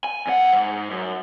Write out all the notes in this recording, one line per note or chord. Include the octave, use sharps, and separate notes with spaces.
G#5
E2 F#5
G#2
F#2